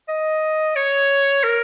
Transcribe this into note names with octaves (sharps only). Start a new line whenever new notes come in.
D#5
C#5
A#4